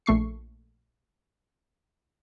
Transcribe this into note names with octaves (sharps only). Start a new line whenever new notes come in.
A#1 A3 C#6 C7